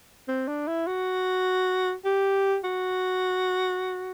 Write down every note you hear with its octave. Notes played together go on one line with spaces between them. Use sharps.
C4
D4
E4
F#4
G4
F#4